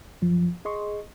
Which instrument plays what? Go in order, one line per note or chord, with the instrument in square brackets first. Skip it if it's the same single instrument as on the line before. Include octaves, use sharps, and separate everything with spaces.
[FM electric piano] F#2 F3
G#4 D#5 C6 C#6